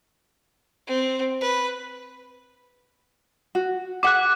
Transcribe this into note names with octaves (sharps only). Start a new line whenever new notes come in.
C4
B4
F#4
G#4 E5 F#5 D6 F#6